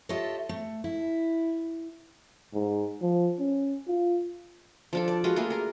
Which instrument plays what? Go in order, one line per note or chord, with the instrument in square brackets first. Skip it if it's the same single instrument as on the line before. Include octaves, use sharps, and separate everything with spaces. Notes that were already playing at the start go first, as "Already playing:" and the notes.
[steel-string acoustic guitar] F4 G4 A4 C#5 D#5 E5
A3
E4
[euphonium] G#2
F3
C#4
F4
[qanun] F3 D4 A4
D5
G#3 F4 F#4 B4
A3 A#3 F4 G#4
G#4 A#4